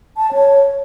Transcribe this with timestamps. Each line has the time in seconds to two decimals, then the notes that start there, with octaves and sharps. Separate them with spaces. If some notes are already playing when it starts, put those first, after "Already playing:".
0.17 A5
0.33 C#5